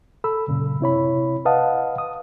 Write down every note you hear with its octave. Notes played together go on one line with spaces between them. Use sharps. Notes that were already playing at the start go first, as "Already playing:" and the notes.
A4 B5 E6
F#2 A#2 C#3
C3 E4 C#5 B5
B4 D#5 F5 F#5 A5 D#6
D#6